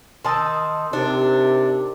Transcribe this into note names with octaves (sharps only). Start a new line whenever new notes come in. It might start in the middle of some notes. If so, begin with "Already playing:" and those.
D#3 A5 C6 D#6 E6
C3 D4 D#4 G4 A#4